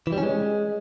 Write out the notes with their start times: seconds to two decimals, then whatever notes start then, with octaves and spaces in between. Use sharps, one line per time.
0.07 E3
0.12 G3
0.18 C#4
0.23 G#3